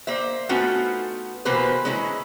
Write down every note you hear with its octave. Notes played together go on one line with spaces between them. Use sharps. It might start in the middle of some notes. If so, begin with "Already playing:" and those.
A#3 C5 E5
A3 B3 C#4 D#4 F4 F#4
B2 E3 A#3 G4 B4 C5
G#3 C#4 E4 A#5